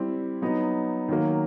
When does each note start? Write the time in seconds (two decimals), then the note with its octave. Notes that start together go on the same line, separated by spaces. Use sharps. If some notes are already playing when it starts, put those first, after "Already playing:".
Already playing: G3 C4 E4
0.42 F#3 B3 D#4
1.08 D#3 F#3 A#3